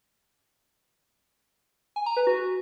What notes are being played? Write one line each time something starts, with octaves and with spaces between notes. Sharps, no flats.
G#5
A#5
B4
F#4